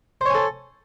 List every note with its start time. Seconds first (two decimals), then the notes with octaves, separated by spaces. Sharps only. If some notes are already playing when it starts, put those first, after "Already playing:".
0.21 C5
0.26 C#5
0.30 G#5
0.35 A4